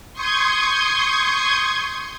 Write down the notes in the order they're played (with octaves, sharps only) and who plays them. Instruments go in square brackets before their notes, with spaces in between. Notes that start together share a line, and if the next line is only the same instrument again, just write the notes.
[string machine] C6 C#6 D#6 G6 G#6